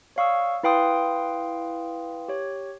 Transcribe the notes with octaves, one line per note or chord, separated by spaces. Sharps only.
C#5 D5 F5 C#6 D#6 E6
E4 B4 F5 G5 C6 D#6
G4 C#5